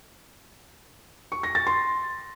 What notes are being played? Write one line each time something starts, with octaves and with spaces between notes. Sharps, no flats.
C#6
A#6
A6
C6